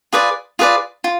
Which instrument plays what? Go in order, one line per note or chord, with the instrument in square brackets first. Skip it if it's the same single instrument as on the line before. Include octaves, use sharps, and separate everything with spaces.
[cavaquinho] F4 G#4 B4 D5
F4 G#4 B4 D5
F4